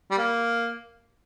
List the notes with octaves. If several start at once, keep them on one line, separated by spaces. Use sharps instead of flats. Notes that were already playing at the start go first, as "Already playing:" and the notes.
G3
A#3